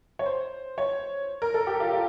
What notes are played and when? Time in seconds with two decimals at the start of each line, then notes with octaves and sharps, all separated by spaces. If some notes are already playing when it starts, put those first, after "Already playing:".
0.19 C#5
0.26 C5
0.78 C#5
1.42 A#4
1.54 A4
1.67 G4
1.80 F4
1.92 F4